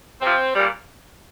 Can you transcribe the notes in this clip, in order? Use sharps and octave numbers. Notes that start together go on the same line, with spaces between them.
C3 F3 C4
A#2 G3